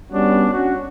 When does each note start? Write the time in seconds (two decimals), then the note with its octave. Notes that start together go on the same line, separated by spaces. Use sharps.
0.11 G3 B3 C#4 D4 F#4
0.52 C#4 D4 F#4